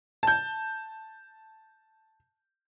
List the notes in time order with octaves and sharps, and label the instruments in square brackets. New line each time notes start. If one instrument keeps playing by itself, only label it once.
[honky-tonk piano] A5 G6